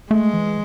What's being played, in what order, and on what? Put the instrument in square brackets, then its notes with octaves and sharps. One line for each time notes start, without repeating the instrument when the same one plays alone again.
[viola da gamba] G#3 [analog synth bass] A3
[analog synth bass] E3